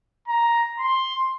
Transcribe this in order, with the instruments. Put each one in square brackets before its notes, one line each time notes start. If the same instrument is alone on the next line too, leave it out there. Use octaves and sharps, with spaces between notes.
[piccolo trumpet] A#5
C6